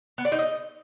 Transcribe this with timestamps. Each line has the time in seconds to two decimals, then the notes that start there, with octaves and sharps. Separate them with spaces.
0.18 B3
0.25 D5
0.32 D#4
0.39 D#5